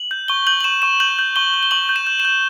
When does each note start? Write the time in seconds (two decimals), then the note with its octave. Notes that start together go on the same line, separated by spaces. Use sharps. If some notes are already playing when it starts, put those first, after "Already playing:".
Already playing: F#7
0.11 G6
0.28 C#6 G7
0.47 G6 F#7
0.61 F#7
0.64 C#6 E7
0.82 C#6 E7
1.00 G6 F#7
1.19 G6
1.36 C#6 G7
1.54 G6
1.63 G7
1.71 C#6 F#7
1.89 G6
1.96 E7
2.07 G6
2.20 E7
2.25 G6